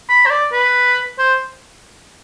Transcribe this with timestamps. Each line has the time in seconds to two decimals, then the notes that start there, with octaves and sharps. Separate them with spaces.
0.09 B5
0.26 C5
0.30 D5
0.52 B4
1.19 C5